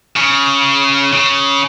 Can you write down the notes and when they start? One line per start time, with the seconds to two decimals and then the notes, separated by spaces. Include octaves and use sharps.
0.16 C#3
1.13 C#3